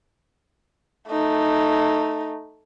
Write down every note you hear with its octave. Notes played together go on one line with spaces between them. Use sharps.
A3 D#4